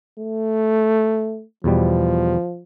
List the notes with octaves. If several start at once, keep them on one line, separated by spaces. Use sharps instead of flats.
A3
E2 B2 F3 G3